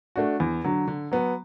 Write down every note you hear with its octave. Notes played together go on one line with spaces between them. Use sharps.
A3 D4 F#4
E2
D3 F#3
D3
F#3 B3